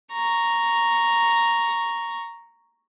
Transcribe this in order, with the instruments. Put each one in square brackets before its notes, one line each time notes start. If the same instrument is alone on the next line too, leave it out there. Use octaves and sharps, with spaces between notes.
[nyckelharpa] A#5 C#6